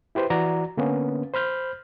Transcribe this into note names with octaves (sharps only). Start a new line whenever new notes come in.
E4 G4 B4 C5
E3 F#4 D5 A#5
D3 A#3 B3 C#4
C5 B5 F6 G6